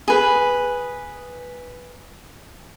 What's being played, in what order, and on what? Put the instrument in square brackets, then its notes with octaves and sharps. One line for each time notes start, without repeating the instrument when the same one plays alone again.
[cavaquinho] G#4 B4